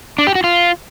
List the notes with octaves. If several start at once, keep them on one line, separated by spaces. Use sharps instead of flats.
D4
G4
F#4
F4